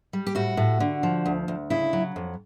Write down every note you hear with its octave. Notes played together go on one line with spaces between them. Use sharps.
G3
G4
A2 F#4
A2
D3
F3
D2
D2
C#3 E4
F#3
F2